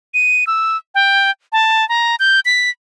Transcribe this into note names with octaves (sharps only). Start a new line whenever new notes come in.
D#7
E6
G5
A5
A#5
G6
B6